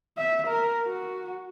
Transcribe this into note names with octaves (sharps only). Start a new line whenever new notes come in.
E5
A#4
F#4